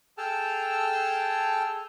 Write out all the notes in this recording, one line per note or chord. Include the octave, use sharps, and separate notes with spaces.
G#4 A4 G5 A5 E6 F6